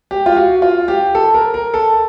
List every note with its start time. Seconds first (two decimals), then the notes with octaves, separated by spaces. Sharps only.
0.11 G4
0.26 F4
0.37 F#4
0.62 F4
0.88 G4
1.15 A4
1.34 A#4
1.54 A#4
1.74 A4